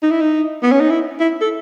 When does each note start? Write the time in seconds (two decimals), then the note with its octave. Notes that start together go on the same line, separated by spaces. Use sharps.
0.03 D#4
0.11 E4
0.21 D#4
0.63 B3
0.72 C#4
0.81 D#4
0.90 E4
1.20 E4
1.41 A4